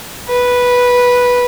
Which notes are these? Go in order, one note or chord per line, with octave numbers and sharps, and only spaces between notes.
B4